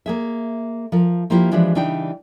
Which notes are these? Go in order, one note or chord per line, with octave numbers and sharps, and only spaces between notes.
A#3 G#4 E5
F3 A#4
F3 A#3 E4 F4 G4
E3 F3 G#3 D4 G4 B4
C#3 E3 G3 D4 D#4 G5